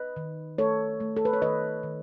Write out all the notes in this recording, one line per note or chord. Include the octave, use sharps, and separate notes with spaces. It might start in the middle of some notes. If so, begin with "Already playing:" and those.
Already playing: B4 D#5
D#3
A3 A4 C#5
A3
A4
B4
C#5
D#3 B4 D#5
D#3